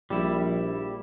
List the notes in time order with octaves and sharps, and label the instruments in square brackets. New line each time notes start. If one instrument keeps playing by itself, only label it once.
[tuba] A#1 [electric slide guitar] G3 E4